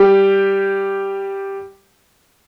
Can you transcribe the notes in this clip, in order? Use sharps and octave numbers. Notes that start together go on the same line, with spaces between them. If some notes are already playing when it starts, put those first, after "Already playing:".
Already playing: G3 G4